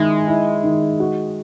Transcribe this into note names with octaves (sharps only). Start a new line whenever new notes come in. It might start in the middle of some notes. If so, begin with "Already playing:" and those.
Already playing: D#3 G#3 E4
E4
D#3
F#4